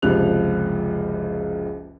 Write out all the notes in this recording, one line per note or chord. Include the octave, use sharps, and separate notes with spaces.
F#1 C#2 C3 F3 F#6 F7